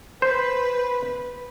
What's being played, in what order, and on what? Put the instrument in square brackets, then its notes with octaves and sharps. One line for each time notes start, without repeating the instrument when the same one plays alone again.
[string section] B4 [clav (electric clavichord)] C5